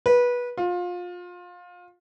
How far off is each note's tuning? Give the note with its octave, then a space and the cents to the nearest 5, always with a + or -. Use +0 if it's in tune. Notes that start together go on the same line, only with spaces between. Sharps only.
B4 -20
F4 +25